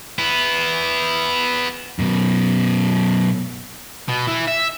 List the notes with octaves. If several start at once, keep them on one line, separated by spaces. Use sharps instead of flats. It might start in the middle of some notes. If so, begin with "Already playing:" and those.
B3 E4
F#2 B2
B2
E3
E5